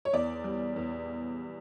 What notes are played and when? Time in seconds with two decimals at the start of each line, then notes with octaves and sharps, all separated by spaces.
0.05 C#5
0.13 E2 D5
0.44 G3
0.76 E2